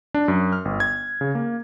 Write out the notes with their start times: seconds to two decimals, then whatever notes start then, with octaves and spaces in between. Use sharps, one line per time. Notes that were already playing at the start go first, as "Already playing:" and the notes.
0.14 D4
0.28 F#2
0.52 F6
0.65 G1
0.80 G#6
1.21 C#3
1.35 A#3